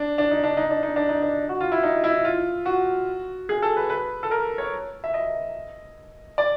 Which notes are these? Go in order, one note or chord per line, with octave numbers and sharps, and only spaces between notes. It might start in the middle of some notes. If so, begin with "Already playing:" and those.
Already playing: D4
D4
D#4
D4
D#4
D4
D#4
D4
D#4
D4
F#4
F4
E4
D#4
E4
F4
F#4
G#4
A4
B4
B4
A4
A#4
C#5
E5
D#5
D5